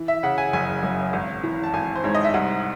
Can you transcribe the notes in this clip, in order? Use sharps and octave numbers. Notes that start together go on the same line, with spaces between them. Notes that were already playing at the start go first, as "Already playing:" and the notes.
Already playing: E3
E5
C#3 F#5
G#5
F#1 G#5
F#2
G#1
E3
A5
G#1 G#5
C5
G#2 C#5
D#5
E5
C2 F#5